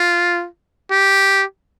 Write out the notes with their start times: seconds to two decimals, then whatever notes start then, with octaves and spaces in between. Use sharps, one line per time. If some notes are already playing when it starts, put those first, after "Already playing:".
Already playing: F4
0.91 G4